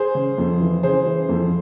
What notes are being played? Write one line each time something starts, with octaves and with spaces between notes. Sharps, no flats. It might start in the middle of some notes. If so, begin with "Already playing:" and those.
Already playing: G#4 C5
C#3
F2
E3
C#3 G#4 C5
E3
F2